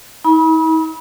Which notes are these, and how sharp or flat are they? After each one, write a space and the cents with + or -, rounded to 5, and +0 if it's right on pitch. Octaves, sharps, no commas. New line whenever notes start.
D#4 +45 B5 -30